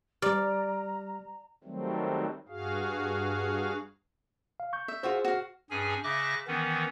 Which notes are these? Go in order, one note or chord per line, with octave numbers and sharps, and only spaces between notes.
G3 G4 D5 A#5 F6
D#3 F#3 G3 A3 C4
G2 F#4 G#4 F5
F5
C#6 G6
E5
F4 F#4 G#4 C5 E5
F#4 F5
G2 C#4 G#4 G#5
C#3 E5 D6 F#6 A#6
D#3 E3 B3 C#4